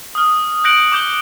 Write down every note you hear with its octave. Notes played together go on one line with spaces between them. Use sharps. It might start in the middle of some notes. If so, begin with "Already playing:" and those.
D#6 F6
F#6 G6 A#6 C#7 D7 F#7
D6 G6 G7